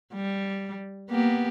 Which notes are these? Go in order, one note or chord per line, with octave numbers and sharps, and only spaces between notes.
G3
A#3 B3 G4